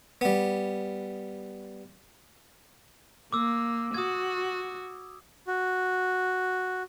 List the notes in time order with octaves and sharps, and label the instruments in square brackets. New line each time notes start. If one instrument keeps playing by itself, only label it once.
[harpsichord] G3 B3
[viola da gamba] A#3 [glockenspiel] D6 E6
[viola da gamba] F#4 [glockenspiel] D#6 G#6
[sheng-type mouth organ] F#4